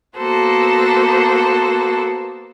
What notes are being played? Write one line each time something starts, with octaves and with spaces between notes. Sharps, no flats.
A#3 B3 F#4 A4 C5